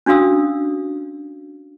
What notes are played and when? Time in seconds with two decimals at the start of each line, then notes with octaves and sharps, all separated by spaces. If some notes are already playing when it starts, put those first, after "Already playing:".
0.06 C#4 D4 F#4 F5 D#6 E6